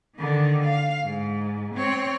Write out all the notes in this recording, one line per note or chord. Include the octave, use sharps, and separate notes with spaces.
D3 D#3
F5
G#2
C4 C#5